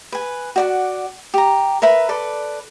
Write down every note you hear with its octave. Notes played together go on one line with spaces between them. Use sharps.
B4 G#5
F#4 D5 F#5
G4 A#5
A#4 B4 E5 B5
A4 B4 D5